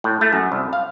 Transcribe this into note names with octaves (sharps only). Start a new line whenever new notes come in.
A2
A3
F#2
C2
F5